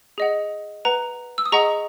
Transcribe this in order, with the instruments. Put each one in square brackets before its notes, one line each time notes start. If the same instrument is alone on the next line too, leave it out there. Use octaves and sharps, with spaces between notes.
[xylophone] G#4 D#5 F#5
B4 F#5 A#5
E6
D#6
G#4 D#5 F#5 A#5 C#6